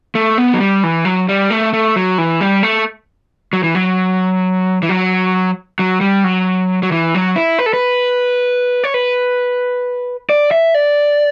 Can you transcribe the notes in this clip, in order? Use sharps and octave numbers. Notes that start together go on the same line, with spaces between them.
A3
B3
F#3
G3
E3
F#3
G3
A3
A3
F#3
E3
G3
A3
F#3
E3
F#3
E3
F#3
F#3
G3
F#3
F#3
E3
F#3
E4
B4
A4
B4
C#5
B4
D5
E5
D5